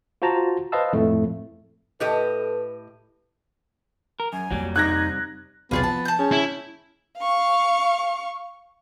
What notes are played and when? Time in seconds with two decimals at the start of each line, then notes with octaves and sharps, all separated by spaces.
0.22 F4 F#4 C5 A5 A#5
0.72 B4 C5 D#5 F5 A5 E6
0.93 F2 A2 A3
2.00 A2 G4 A4 B4 D#5
4.20 A#4
4.33 F#2 G#5
4.51 F2 F#3 G3 A#3
4.76 C3 G3 D#4 F#6 G#6 A#6
5.71 B1 E2 C3 B3 F4 G#4 A5
5.84 F3 A5
6.05 A5 G6
6.19 C#4 G#4
6.32 E4
7.18 F5 C#6